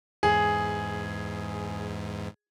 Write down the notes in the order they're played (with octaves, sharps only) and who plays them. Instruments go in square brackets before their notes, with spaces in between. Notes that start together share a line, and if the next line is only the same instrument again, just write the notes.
[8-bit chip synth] E2 G#2 [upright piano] G#4